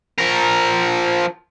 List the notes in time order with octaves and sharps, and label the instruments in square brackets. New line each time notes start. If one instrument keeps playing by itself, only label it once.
[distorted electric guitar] F3 A#4